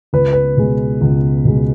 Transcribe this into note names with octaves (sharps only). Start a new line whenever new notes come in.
C#2 B4
B4
B2 G#3
C#2
B2 G#3